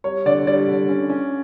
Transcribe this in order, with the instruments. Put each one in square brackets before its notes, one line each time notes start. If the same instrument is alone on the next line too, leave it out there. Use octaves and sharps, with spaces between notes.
[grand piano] G3 [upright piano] C#5
[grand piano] D3 [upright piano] D5
[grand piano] G3 [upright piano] D5
[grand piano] D3
C#4
C#4